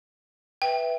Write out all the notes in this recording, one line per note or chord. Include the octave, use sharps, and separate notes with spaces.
B4 E5 G5